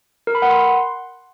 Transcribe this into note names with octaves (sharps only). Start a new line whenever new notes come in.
A#4
B5
F#5
C6